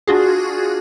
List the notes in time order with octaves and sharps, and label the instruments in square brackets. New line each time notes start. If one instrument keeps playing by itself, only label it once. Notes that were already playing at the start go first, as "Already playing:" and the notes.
[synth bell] D4 F4 F#4 G#4